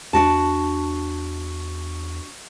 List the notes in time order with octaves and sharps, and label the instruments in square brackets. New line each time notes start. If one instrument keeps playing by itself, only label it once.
[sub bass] E2 [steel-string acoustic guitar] D4 F#4 A5